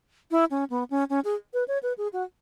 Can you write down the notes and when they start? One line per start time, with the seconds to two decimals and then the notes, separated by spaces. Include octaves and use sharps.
0.31 E4
0.51 C#4
0.70 B3
0.90 C#4
1.10 C#4
1.25 G#4
1.54 B4
1.68 C#5
1.83 B4
1.98 G#4
2.13 F#4